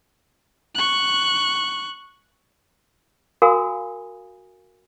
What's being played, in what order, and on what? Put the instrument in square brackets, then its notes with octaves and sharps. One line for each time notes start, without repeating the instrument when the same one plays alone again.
[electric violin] C#6 F#6
[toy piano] F#4 A#4 F5 G#5 B5 D#6